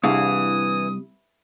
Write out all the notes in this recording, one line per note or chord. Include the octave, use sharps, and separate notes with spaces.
C2 E3 D4 G#4 F5 D#6